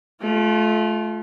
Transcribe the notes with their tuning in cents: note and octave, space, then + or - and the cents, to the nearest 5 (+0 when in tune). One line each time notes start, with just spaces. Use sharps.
A3 -30 F4 +0